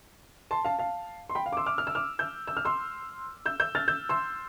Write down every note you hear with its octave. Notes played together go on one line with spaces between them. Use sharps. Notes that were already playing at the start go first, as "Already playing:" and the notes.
A5 C6
F5 A5
F5 A5
C6
G5 B5
F5
D6
C6 E6
D6 F6
F6
E6
D6 F6
E6 G6
E6
F6
C6 E6
E6 G6
E6 G6
F6 A6
E6 G6
C6 E6